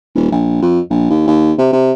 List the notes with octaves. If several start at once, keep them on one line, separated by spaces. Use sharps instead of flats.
D#1
A#1
F2
A#1
D#2
D#2
C3
C3